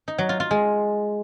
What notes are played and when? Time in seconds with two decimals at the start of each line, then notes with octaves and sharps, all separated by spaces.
0.08 D#4
0.18 F#3
0.29 F4
0.40 F4
0.51 G#3